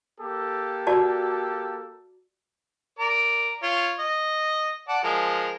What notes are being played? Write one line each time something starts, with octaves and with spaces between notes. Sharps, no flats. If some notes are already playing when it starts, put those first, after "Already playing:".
A#3 G4 A4
F#4 D5 A5
A#4 D5 A#5
F4 C#5
D#5
D5 F#5 A5
F3 G#3 A#4